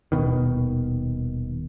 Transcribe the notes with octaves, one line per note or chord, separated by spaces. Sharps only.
D#1 B2 D#3